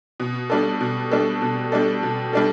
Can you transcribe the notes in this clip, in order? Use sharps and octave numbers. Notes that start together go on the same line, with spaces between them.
B2
G3 D4 A4
B2
G3 D4 A4
B2
G3 D4 A4
B2
G3 D4 A4